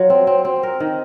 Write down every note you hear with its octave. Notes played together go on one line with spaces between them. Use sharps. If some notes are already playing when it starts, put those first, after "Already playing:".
Already playing: F#3 F4
C4
C4
C4
A#4
D#3